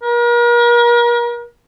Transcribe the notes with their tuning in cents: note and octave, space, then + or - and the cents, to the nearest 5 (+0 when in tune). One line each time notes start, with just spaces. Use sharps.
A#4 +40